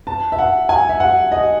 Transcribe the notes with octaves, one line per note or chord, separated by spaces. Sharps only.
A5
E5
F#5
G#5
E5
F#5
D#5